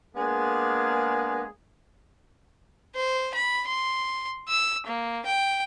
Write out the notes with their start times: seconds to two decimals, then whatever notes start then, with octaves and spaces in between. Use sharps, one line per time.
0.15 G#3 A#3 B3 D4 G#4
2.95 C5
3.34 B5
3.67 C6
4.48 E6
4.86 A#3
5.25 G5